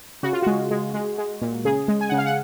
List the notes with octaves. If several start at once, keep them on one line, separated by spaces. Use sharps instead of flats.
C#3 F#4
F4
G#3 F#4
G#3
G#3
G#3
A#2
C#3 G#4
G#3
G#5
C#3 F#5
F5
F#5